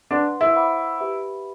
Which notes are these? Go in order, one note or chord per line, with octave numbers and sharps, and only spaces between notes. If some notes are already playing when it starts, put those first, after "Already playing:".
D4 B4 F#5 C6
E4
C5 F#5 B5 D6
G4 B4 E5 B5